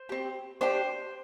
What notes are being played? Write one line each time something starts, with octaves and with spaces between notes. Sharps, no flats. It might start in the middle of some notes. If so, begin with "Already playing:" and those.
Already playing: C5
C4 G4
D4 G4 C5